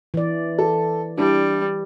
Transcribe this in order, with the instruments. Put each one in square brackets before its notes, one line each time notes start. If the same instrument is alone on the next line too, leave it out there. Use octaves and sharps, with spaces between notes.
[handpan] E3 D5
[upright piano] A4
[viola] G3 [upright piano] D4 E4